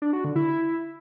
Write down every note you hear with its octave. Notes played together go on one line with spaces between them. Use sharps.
D4
F#4
D3
E4